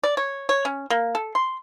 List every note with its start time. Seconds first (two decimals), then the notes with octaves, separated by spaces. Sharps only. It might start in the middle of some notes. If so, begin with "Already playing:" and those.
0.04 D5
0.17 C#5
0.49 C#5
0.65 C#4
0.90 A#3
1.15 A4
1.35 C6